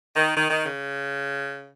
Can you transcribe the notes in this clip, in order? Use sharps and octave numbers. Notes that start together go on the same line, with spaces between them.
D#3
D#3
D#3
C#3